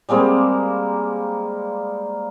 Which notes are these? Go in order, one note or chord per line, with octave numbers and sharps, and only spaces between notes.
G3 G#3 A#3 C4